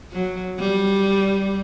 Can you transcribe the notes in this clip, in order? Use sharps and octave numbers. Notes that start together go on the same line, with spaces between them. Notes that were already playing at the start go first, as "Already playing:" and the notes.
F#3
G3